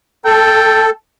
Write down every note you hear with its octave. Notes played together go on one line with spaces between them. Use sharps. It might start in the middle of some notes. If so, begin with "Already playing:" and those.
A4 G5 A5